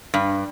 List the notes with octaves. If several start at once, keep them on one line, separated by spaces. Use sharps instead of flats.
G2